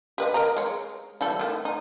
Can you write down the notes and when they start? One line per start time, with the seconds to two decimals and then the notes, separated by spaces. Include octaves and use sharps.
0.18 G4 B4 D#5
0.34 A#4 D#5 A#5
0.56 G#3 C#5
1.21 E3 G3 A4
1.39 D#3 A3
1.65 D#4